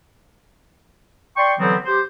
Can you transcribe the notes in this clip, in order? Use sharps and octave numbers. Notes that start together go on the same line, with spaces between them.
D5 G5 C6 C#6
D3 E3 F#3 G3 B3 C4
G4 C5